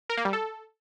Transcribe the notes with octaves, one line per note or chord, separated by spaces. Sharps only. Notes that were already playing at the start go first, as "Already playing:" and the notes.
A#4
A#3
G3
A4